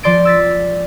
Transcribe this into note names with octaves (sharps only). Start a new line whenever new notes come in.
F3 D5 C6 A6 D7
E6 A6 B6